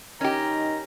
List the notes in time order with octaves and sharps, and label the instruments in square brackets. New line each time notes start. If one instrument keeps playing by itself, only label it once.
[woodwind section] D#3 A#5 [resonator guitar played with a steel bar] C#4 G4 [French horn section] D#4